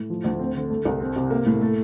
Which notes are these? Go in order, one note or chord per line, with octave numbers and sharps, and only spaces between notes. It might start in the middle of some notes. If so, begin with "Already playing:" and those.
Already playing: A2
F3
D2
C4
D3
A3
C2
C4
C3
A#3
A2
A3